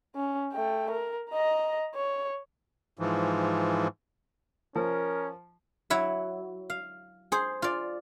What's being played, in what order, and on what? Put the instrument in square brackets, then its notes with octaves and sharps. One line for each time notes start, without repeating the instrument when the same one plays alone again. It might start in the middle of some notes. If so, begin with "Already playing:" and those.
[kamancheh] C#4
A3 G5
A#4
D#5 A#5
C#5
[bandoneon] G#2 E3 F3
[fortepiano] F3 [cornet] C#4 [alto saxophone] A#4
[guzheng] F#3 E4 E5
F5
G#4 C5
F4 D5